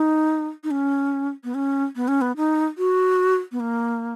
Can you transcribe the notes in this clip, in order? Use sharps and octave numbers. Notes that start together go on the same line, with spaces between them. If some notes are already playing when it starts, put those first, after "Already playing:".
Already playing: D#4
D#4
C#4
B3
C#4
B3
C#4
B3
D#4
F#4
B3
A#3